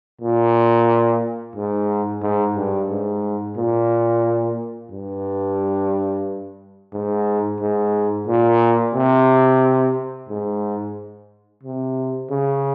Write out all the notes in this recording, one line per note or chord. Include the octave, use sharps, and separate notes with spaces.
A#2
G#2
G#2
G2
G#2
A#2
G2
G#2
G#2
A#2
C3
G#2
C3
C#3